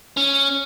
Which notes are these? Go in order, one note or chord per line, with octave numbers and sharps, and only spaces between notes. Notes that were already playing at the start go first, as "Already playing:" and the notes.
C#4